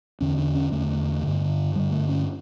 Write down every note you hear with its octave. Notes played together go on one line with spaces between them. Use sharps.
E2 D3 C#4
D4
C#4
E2 D3 A3
G2 D3
G2 D3 G3
A3
C#4